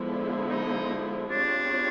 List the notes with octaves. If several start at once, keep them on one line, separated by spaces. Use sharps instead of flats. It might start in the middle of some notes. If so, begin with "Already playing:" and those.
Already playing: D3 F3 G#3 B3 E4
D#4
G3 C4 D4 F4 G#4 C#5